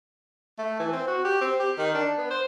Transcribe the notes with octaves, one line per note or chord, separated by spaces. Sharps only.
A3
E3
C4
F#4
G4
C4
G4
D#3
D4
B3
C5